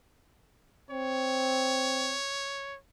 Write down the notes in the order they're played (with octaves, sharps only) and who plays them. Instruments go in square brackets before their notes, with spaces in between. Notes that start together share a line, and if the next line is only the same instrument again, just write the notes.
[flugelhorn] C4 [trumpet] C#5